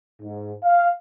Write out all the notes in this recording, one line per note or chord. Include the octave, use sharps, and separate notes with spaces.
G#2
F5